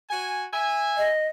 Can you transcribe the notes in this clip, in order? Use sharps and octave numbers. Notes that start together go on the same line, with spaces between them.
F#4 G#5
E5 G#5
D#5